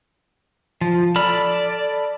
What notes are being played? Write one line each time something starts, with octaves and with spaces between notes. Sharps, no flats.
F3
A4 D5 B5 F6